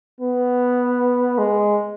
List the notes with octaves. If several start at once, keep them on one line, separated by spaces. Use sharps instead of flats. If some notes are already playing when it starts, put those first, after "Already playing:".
B3
G#3